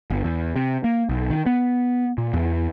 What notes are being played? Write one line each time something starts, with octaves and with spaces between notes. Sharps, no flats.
G1
E2
C3
A#3
B1
D#3
B3
A#2
E2